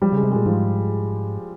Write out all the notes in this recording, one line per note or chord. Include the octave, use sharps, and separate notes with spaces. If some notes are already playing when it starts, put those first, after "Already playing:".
F3 G3
C#3 G#3
C3
A#2 G#3
G#2 F3